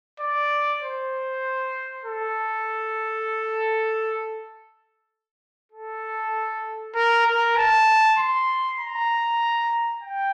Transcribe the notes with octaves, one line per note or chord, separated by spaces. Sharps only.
D5
C5
A4
A4
A#4
A#4
A5
C6
A#5
G5